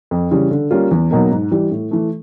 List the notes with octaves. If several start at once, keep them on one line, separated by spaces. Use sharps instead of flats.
F2
C#3 E3 G3
D3
G3 A#3 C#4 F4
E2
B2 F#3 A#3 D#4
G#2
E3 G3
A2
E3 A3